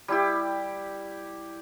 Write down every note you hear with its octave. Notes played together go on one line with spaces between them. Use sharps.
G3 E4 G4